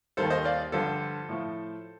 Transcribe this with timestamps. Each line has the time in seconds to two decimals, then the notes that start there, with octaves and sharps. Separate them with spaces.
0.17 D#2 D#3 G3 A4 C5
0.30 C5 D#5
0.44 D5 F5
0.72 G2 D3 F3 A4 C5
1.29 A2 F3